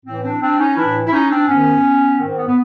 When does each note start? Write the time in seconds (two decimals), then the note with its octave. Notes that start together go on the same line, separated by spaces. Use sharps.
0.05 A2 E3 C4
0.23 C4 D4
0.42 C4 D4
0.59 C#4 D#4
0.76 A2 E3 D4 E4
1.07 E4
1.12 C#4 D#4
1.30 C4 D4
1.48 G#2 D#3 B3 C#4
2.19 G#2 D#3 C4
2.37 B3
2.47 B3